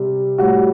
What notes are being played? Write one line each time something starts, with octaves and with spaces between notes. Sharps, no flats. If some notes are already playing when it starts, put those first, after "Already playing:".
Already playing: C3 G3
A2 G3 F#4